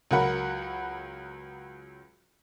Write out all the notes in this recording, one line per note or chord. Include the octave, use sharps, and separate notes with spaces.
C#2 F#3 A#4 F#5 B5